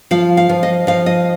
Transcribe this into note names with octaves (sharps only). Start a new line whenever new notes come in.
F3 F5
F5
F3
D#5
F3 F5
D#5